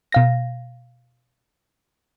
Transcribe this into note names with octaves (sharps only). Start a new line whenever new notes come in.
B2 F5 A#6